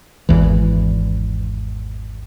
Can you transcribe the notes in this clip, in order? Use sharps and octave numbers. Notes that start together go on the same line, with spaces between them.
G#1 E2 E3